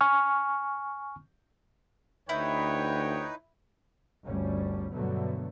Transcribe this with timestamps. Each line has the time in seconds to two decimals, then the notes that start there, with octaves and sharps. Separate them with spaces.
0.01 G#5 C#6 F6
2.29 D2 D#4 E4 B4 C#5 G5
4.24 G1 D2 G3 C#4
4.92 G2 B2 D3 F#3 A3 B3